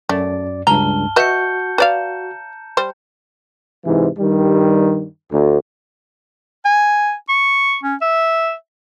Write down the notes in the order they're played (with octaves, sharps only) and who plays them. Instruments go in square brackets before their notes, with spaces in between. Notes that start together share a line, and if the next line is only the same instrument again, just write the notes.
[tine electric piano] F#2 D5 [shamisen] A3
[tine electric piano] C#2 G2 [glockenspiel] A5 F6 G7 [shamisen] A#5
[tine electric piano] F#4 [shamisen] B4 D#5 E5 [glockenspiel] G6 C#7
[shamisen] B4 D5 F5 [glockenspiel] A#5 E7
[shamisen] G3 C5
[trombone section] G#2 C3 E3
G2 D#3 G3
D2
[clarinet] G#5
C#6
C#4
E5